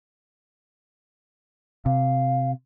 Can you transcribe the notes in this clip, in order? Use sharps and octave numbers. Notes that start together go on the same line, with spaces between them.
C3 F5